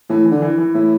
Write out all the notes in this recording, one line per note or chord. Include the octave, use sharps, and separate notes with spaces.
A2 E3
E3
D3
E3
E3
A2 E4